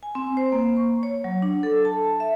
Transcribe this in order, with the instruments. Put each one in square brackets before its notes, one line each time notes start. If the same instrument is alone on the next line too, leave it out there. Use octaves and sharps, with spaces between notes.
[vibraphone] G#5
C4
C5
A#3
C#6
C#5
F#3
D4
A4
A5
E5